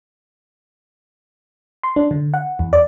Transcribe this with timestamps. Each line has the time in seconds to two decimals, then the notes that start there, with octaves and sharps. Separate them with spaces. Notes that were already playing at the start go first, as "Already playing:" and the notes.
1.83 C6
1.96 D4
2.11 D3
2.34 F#5
2.59 E2
2.73 D5